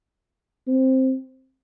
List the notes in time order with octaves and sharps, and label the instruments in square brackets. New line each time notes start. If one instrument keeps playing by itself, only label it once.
[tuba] C4